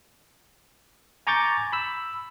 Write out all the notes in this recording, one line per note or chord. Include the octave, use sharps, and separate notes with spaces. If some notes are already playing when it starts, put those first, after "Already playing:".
G#5 A#5 C#6 D6 G6 A6
B5 E6